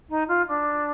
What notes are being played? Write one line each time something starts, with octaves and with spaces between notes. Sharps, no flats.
D#4
F4
D4